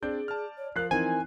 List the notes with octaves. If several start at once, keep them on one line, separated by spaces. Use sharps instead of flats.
C4 D4 G#4 D5 G6
A5 F6
C#5
F3 A#4 F5 F#6 C7
E3 C4 D#4 A#4 G#5